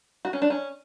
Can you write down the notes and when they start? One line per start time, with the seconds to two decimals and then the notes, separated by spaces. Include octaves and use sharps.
0.25 F#4
0.33 C#4
0.42 D4
0.50 C#4